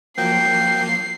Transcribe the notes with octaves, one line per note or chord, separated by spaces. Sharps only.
F3 F#3 A#3 G5 C7